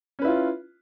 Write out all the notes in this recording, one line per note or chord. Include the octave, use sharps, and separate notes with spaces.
C#4 E4 F4 B4